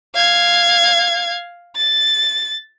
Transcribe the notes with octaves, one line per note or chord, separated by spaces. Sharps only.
F5 G#6
A6